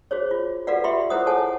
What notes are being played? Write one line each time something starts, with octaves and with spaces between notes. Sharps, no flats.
F#4 G#4 C5 C#5
F4
F#4 A4 B4 D5 F5 F#5
F4 G4 E5 B5 C6
E4 G#4 A#4 C5 F#5 D#6
A4 C#5 F#5 G#5 A5